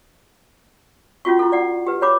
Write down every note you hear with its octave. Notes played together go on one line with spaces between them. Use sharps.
C#4 F4 F#4 C#6
E4 F4 A4
D5 F#5
G4 B4
G#4 C#5 B5 D6